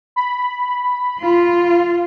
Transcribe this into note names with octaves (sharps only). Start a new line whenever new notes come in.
B5
F4